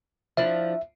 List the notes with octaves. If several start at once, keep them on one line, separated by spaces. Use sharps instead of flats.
F3 D4 E4 E5